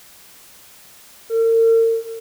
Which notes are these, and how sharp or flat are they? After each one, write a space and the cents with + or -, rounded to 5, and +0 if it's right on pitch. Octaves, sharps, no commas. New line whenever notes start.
A#4 -45